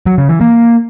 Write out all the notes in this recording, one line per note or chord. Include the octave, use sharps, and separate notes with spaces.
F#3
C#3
E3
A#3